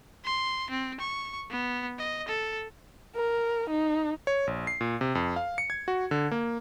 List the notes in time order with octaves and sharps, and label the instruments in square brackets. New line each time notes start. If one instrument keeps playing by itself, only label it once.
[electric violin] C6
C4
C#6
B3
D#5
A4
[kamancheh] A#4
D#4
[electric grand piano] C#5
A#1
C7
A#2
C3
F2
F5
C#7
G#6
F#4
D3
A#3